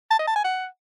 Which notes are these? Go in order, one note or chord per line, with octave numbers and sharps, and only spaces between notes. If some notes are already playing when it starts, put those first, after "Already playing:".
A5
D#5
A5
G#5
F#5